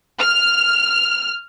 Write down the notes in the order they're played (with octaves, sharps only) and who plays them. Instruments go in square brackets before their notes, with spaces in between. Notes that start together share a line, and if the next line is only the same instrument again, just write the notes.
[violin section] F6